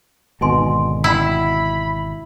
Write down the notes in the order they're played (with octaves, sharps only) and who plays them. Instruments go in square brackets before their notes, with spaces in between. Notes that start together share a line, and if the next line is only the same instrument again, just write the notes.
[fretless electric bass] G#1 B2 D3 [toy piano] D#4 G#5 C6
[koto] E4 [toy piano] F#5 G5 [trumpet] B5